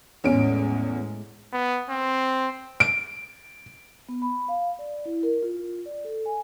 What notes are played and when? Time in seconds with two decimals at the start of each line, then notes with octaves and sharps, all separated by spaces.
0.24 E2 A2 G#3 C#4 D7
1.53 B3
1.90 C4
2.80 D7
4.09 B3
4.22 B5
4.48 F5
4.79 D5
5.05 E4
5.23 A#4
5.43 F4
5.86 D5
6.04 A4
6.26 G#5